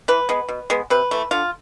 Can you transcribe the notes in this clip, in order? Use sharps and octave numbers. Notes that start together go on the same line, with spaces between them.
E3 B4
G#3 B3
B2
G#3 B3
C3 B4
E3 A3
D3 F4